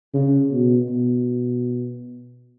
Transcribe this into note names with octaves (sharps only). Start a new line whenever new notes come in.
C#3
B2
B2